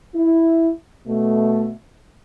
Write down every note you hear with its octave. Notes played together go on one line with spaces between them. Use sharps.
E4
B2 A3